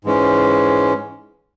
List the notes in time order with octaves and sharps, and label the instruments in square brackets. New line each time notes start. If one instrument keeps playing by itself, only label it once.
[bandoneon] G#2 E3 G#3 C#4